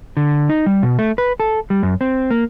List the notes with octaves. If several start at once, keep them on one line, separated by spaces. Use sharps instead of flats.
D3
D#4
G3
B2
A3
B4
A4
G3
F#2
C4
A#3